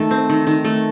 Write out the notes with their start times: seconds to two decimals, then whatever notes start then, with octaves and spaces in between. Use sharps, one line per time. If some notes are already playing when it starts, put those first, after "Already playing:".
Already playing: D#3 A3
0.11 C4
0.30 D#3
0.47 D#3
0.65 A3